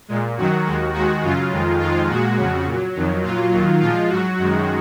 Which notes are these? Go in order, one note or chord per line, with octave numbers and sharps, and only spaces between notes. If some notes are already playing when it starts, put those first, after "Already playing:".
A#2 G#3
F#2 D#3 F#3 F#4
D#2 D#3 G#3
D#2 D#3 G#3 F#4
F#2 C#3 F#3 F4
F2 D#3 G#3
F2 D#3 G#3 F4
A#2 G#3 F#4
F2 C#3 F#3
A#2 F#3
F2 D#3 F#3
A#2 F#3 F4
D#2 D#3 F#3
A#2 F3 G#3 F4
G#2 F#3 F#4
F#2 D#3 G#3